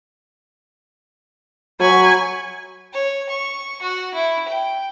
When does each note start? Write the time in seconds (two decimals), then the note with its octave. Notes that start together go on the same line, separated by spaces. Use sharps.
1.80 F#3 G#5 B5 C#6
2.93 C#5
3.29 C#6
3.82 F#4
4.14 E4
4.48 G5